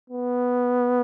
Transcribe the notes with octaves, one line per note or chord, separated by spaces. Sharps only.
B3